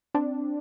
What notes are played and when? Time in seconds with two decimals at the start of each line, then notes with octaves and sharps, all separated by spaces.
0.15 C4 D4